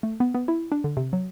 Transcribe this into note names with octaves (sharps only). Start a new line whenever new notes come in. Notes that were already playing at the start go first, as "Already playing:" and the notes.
A3
B3
B3
E4
D4
D3
C3
F#3